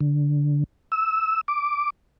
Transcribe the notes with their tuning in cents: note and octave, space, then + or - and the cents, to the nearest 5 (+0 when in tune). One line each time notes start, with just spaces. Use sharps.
D3 -10
E6 -15
D6 -5